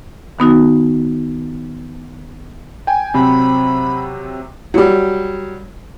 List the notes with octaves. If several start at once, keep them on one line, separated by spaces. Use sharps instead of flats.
D#3 B3 D#4 F#4
G5 G#5
C3 F#3 C4 B5
F#3 G3